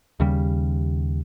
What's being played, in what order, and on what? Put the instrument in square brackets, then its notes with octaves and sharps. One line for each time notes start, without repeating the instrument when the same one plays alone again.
[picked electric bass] D#2 C#3 G3